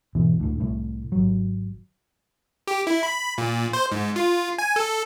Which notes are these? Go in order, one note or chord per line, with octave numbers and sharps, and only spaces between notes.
G#1 E2 B2 E3
D2 A2
C2 A2
G#1 F#3
G4
E4
B5
A#2
C5
G#2
F4
G#5
A4